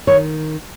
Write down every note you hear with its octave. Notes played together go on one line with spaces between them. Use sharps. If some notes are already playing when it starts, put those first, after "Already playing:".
D#3 C#5